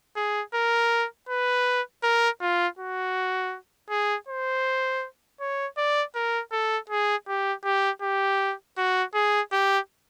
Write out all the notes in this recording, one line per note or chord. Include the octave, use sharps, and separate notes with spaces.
G#4
A#4
B4
A#4
F4
F#4
G#4
C5
C#5
D5
A#4
A4
G#4
G4
G4
G4
F#4
G#4
G4